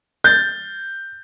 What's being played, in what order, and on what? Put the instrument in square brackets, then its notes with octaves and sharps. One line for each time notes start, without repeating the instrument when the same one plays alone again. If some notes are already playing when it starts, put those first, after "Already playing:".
[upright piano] G6 A6